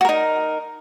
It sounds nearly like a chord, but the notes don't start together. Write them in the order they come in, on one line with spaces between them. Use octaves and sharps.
F#4 A#4 D#4